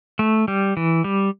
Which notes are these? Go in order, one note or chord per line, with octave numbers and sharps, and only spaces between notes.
A3
G3
E3
G3